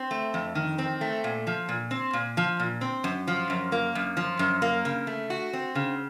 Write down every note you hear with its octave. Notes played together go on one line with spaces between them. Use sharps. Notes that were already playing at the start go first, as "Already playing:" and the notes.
Already playing: C4
A3
F2
D#3
C4
A3
A#2
F3
A#2
C4
A#2
F3
A#2
C4
F#2
F3
F#2
A#3
F#2
F3
F#2
A#3
C#3
A3
F#4
C4
C#3